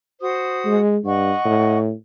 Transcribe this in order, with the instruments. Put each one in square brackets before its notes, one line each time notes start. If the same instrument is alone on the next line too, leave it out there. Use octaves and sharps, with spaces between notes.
[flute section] F#4 C5 D#6
[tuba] G#3
[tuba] G2 [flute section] D#5 F#5 C#6
[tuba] A2